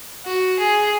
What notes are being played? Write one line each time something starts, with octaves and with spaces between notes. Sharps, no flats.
F#4
G#4